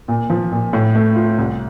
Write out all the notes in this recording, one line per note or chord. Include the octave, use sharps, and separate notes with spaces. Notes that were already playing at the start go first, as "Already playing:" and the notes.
A#2
F3
A#2
A2
A3
F4
C2